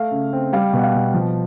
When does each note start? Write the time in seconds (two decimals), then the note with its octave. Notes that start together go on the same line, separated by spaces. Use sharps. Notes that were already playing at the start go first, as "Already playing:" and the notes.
Already playing: A3 F5
0.11 C#3
0.33 C4
0.53 G3 F5
0.73 B2
0.78 F#5
0.83 F5
0.94 B2
1.14 F3